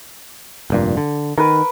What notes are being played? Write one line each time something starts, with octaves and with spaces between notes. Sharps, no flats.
F1 G2 A#2
D3
D#3 A#4 B4